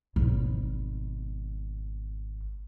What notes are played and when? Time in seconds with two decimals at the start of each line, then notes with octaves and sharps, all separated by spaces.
0.16 G#1 B2